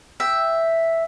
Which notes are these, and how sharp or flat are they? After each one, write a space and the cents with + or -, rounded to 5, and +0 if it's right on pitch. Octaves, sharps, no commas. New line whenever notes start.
E5 +0 G5 +0